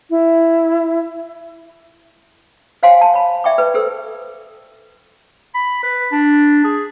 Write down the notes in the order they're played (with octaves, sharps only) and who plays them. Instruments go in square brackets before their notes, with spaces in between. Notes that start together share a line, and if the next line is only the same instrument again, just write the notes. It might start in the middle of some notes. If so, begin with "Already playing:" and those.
[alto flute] E4
[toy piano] C5 C#5 F5 G#5 C6
A5
C#5 B5
D5 E5 G5 C#6 D6
B4
G4 A4 C5 E6
[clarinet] B5
B4
D4
G#4